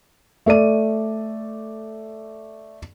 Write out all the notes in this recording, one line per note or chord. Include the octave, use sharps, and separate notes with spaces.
A3 A4 D5 D#7